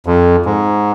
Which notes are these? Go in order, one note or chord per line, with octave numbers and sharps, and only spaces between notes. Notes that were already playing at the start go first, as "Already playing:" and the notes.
F2
G#2